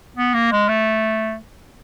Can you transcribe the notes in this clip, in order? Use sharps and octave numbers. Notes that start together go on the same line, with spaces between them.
B3
A#3
G#3
A3